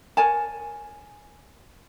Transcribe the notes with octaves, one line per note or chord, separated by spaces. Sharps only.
A#4 C#5 G#5 A5